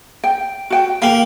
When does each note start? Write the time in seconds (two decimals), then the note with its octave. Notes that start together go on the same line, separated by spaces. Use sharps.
0.24 G5
0.70 F#4 G5
1.02 A#3 F5 G5